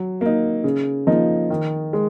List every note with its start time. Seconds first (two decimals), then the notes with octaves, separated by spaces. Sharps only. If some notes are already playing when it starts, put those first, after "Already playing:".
Already playing: F#3
0.21 A#3 D#4
0.64 C#3
1.07 F3 A#3 D#4
1.50 D#3
1.93 G#3